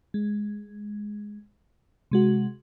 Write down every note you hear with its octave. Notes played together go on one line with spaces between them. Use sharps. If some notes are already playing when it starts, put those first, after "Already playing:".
G#3
C3 G#3 F#4